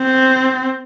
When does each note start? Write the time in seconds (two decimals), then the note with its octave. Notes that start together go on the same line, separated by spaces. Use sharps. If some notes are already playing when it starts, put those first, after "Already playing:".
Already playing: C4